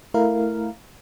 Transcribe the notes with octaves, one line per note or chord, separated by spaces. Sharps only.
A3 E4 A#4 F5